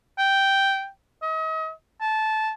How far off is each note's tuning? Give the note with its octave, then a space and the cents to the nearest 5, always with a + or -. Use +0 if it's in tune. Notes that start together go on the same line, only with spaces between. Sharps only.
G5 -5
D#5 +40
A5 -15